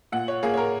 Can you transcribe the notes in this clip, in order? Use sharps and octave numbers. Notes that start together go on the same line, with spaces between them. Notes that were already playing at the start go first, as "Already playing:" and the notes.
A#2 F#5
C#5
A#3 G#4
C#5
A#4